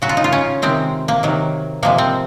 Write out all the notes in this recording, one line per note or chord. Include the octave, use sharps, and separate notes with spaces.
C#3 F#3 F#4
F4
D#4
F4
C#4
C3 D#3 G#3 C4
A#3
C3 D#3 F#3
C3 F3 G#3 A#3
C4